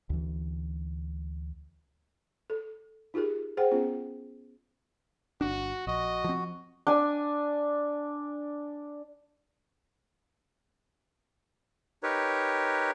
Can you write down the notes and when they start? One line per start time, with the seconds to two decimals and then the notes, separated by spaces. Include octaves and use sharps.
0.10 D2 E3
2.50 A4
3.14 D#4 F4 G4 G#4 A#4
3.57 G#4 C5 F#5 G5
3.71 B3 C#4 F4 G#4
5.41 G1 D4 F#4
5.87 A#1 F#4 D#5
6.24 F3 C4
6.87 D4 G#5
12.03 D#4 G4 A#4 B4 C#5